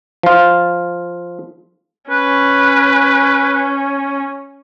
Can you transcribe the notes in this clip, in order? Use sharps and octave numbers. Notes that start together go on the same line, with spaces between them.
F3 F4
C#4 B4